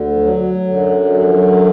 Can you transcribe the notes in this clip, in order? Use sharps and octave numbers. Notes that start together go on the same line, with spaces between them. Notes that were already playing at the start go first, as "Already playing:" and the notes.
Already playing: D2 D3
F3
F#3
F#2 D3
F#3
F3
F#3